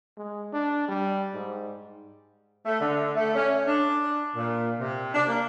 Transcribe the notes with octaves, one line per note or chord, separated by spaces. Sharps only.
G#3
D4
G3
G#2
A3
D3
A3
C#4
D4
A#2
C3
D4
A#3